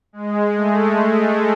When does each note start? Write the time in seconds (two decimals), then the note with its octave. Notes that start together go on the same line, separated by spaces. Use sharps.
0.13 G#3
0.56 A3
0.98 G#3